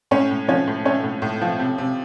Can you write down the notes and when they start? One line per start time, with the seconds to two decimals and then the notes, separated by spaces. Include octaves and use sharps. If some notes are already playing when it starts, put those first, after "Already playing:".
0.11 A2 C#4 C#5
0.31 A2
0.48 F3 C#4 C#5
0.67 A2
0.85 A3 C#4 C#5
1.03 A2
1.22 A2
1.41 F3
1.59 C3
1.78 C3